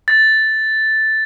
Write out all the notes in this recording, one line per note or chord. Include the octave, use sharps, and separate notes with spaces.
A6